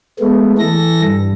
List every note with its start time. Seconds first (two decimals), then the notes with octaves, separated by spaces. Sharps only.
0.19 G#3 A3 B3
0.59 E3 A4 A#6
1.02 G2